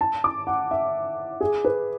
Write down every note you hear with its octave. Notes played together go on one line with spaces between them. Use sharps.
A5
D6
F#5
E5
G#4
B4